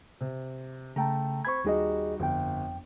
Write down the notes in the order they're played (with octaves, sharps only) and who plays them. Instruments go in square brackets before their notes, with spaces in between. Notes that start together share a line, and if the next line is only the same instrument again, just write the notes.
[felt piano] C3
[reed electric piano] C#3 G5 A5 [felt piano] A3 A#5
[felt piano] C4 B5 [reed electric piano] C#6 G#6
[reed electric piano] D#2 G#4 D#5 [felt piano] G3 D#4 F#4
[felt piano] G1 [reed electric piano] F2 G5